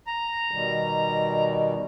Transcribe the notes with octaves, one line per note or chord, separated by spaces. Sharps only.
A#5
B2 D#3 G3